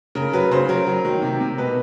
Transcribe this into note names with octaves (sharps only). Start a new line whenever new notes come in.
C#3 A#4
F#3 B4
C#3 C5
F#3 A#4
F#3
D#3
C3
C3
B2 B4